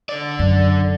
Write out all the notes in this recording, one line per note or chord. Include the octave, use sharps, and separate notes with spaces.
D3 D5
F#2